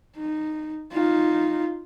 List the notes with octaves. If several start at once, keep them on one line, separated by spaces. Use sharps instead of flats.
D#4
D#4 F4